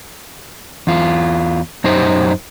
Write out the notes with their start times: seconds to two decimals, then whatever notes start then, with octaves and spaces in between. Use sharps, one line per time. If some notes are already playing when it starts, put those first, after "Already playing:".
0.87 E2 F4
1.84 F#2 D#4 G4 C5